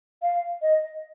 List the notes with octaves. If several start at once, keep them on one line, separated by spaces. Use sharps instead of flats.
F5
D#5